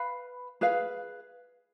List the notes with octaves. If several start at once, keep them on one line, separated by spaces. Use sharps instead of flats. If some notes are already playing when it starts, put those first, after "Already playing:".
Already playing: B4 F5 B5
G#4 B4 F5